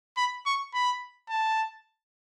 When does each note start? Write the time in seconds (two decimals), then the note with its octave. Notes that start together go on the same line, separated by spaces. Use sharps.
0.17 B5
0.46 C#6
0.74 B5
1.29 A5